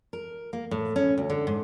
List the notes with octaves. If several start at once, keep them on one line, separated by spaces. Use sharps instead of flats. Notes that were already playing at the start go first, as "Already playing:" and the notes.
A#4
A#3
A2
C#4
D2
D3
G#2